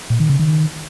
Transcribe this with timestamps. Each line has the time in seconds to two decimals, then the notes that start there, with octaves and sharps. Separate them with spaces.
0.10 A#2
0.20 D#3
0.30 C#3
0.39 D#3